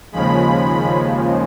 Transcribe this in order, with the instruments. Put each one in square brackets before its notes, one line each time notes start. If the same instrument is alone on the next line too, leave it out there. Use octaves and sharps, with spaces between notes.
[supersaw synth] D#2 C#3 F3 G#3 B5